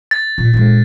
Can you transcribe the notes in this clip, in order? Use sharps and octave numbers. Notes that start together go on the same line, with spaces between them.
A6
A#2
A#2 G#3